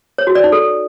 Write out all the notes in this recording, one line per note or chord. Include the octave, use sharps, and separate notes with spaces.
C#5
F#4
D5
D#4
A4